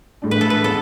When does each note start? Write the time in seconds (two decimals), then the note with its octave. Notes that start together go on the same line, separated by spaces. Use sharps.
0.22 A2 G#3 D4
0.31 B4
0.41 A4
0.50 B4
0.64 G#3 B3 A4